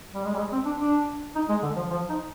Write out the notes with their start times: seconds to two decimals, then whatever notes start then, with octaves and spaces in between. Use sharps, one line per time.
0.14 G3
0.24 G#3
0.34 G3
0.38 G#3
0.52 C4
0.65 D4
0.80 D4
1.35 D#4
1.49 G#3
1.62 D3
1.76 F3
1.90 F3
2.09 D#4